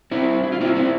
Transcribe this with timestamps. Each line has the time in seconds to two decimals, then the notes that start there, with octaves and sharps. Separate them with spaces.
0.11 C4 E4
0.44 E4
0.52 F4
0.61 C4 E4
0.75 C4 E4